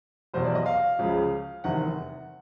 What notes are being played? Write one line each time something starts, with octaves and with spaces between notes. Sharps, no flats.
F1 E2 B2 F#3 C5
D5
D#5
F5
C#2 C#3 F3
F1 E2 C3 D#3 F#5